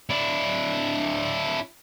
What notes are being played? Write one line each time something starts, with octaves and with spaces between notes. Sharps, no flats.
D4 E4